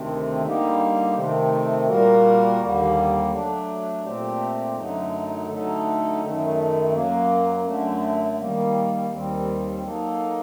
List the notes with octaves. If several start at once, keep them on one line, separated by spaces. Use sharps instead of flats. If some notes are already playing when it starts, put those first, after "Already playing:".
Already playing: D2 C3 D#3 A3 C4
D3 G3 A#3 D#4 G4
C3 D#3 A3 C4
A#2 G3 A#3 F#4 A#4
D#2 D3 G3 A#3
F#3 A3 D4
A#2 A3 C4 G4
F#2 D3 F#3 A3 D#4
D3 F#3 A3 D#4 A4
F#2 D#3 A3
F#2 F#3 A#3
F#2 D3 A3
D#3 G3 A#3
D#2 D#3 G3 C4
F#3 A#3 D#4 A4